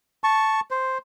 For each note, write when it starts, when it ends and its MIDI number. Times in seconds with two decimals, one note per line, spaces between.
0.24 0.60 81
0.24 0.60 85
0.71 0.98 72